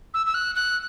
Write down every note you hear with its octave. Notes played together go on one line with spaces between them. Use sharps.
E6
E6
F#6
F#6